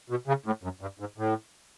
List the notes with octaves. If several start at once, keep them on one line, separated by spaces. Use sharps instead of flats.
B2
C#3
A2
F#2
G2
G#2
A2